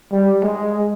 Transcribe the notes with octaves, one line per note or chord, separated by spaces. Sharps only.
G3
G#3